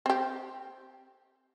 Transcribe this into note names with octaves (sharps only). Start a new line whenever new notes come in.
C4 G4